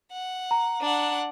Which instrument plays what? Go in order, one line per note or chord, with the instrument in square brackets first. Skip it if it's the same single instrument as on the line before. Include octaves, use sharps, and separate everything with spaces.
[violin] F#5
[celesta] A#5
[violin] D4 F#5